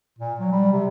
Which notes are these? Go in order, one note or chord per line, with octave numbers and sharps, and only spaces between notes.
A#2
F#3
G3
C3